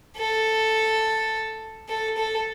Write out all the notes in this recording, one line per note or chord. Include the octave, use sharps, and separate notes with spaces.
A4
A4
A4